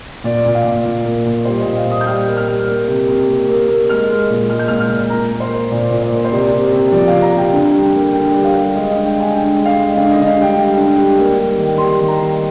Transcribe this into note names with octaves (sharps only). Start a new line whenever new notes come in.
A#2 D5
A#2
F5
A#2
A#2
A#3
A#2
G3 C5
D#5
A#2
F5
A#2
D#6
G6
G3 F6
A#3
F6
G3
A#3
C3
C3
A#3
A#3
A#3
G#3 F6
G#3
A#2
G#3 F6
G6
A#2 F6
F6
A#2
A#3 A#5
A#3
C5
A#3
A#2 D5
A#2
C5
A#3
C5
C3 D5
C3
C3
F3 D5
C3 F5
A#5
C3 G5
D3
G3
A#3
D3 G5
G3
F5
G3
G#3 D#5
D3 F5
G5
G#3 G#5
D3 G5
G#3
F5
G#3
D3 F5
D3 D#5
F5
G3
G5
G3
D3
G3
A#3
G3
D#3
G3 C6
D#3
A#5
D#3